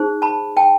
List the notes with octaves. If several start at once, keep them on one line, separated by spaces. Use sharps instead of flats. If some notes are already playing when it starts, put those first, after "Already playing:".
Already playing: D#4 G#4 C5
A5 B5
G5 A5